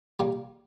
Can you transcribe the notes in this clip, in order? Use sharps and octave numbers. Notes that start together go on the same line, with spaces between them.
A#2 G3 A#3